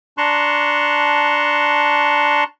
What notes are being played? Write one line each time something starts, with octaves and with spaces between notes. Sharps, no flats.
D4 A5 A#5 C6 C#6 F#6